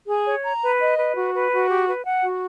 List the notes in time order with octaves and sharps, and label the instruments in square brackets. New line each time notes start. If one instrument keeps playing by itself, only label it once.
[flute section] G#4
C#5
A#5
B4
D#5
B4
F#4
B4
F#4
G4
B4
F#5
F#4